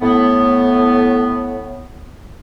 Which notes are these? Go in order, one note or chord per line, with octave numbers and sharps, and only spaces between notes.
A2 B3